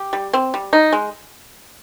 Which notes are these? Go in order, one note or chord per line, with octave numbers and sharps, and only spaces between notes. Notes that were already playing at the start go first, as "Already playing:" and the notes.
Already playing: G4
G3
C4
G3
D#4
G#3